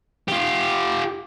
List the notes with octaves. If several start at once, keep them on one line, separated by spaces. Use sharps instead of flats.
F4 G4